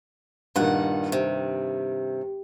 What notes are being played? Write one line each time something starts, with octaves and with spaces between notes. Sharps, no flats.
G2 A#2 D#3 F#5
C3